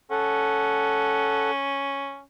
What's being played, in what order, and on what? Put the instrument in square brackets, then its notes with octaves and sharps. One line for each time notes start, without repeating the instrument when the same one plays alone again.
[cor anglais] C#4 [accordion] A4 F#5